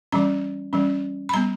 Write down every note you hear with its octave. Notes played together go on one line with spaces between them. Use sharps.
E3 G3 C#4 A#5
E3 G3 C#4
B5
G3 B3 A#5